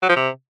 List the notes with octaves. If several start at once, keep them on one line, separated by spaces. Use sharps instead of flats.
F#3
F3
C3